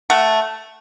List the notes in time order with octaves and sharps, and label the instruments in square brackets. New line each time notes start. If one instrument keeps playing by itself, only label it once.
[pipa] A3 F#5